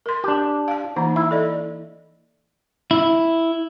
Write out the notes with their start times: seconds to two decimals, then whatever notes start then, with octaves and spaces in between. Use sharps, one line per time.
0.06 A#4 C6
0.24 D4 G4
0.68 F5 A5
0.96 E3 A#3 D#4 A#5
1.16 E4 B5
1.31 A4 D5 D#5
2.91 E4